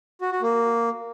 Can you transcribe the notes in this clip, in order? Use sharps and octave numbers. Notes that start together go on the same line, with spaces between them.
F#4
F#4
A#3